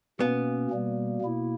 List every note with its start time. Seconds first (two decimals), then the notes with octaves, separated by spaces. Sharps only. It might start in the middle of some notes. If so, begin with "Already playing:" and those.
0.20 B2 A#3 B3 C#4
0.71 B2 G3 A#3
1.22 B2 A#3 E4